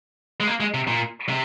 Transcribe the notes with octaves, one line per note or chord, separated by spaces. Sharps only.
G#3
A#3
G#3
C3
A#2
C3